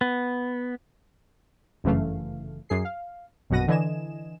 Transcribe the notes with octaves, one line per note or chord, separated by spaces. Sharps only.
B3
G1 F#2 C#3 E3 A3 F5
F#2 G#4 C7
F5
A#1 F#2 B2 F#5 A#6 D#7
D3 E3 D#5 G#5 E7